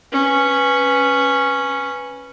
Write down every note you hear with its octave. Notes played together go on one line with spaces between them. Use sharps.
C#4 B4